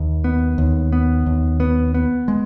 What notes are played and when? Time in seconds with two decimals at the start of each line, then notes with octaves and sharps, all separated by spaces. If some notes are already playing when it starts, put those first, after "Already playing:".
Already playing: D#2
0.24 B3
0.58 D#2
0.92 B3
1.26 D#2
1.60 B3
1.94 B3
2.28 G#3